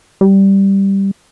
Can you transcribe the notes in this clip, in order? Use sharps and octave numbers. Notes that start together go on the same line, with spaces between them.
G3